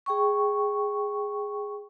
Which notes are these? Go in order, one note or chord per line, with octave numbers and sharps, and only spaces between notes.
G#4 G5 C#6